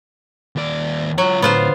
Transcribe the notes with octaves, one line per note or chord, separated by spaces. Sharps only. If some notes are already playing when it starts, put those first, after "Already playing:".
D#2 D5
F#3 F4 C#5
A2 D3 B3 F4 C5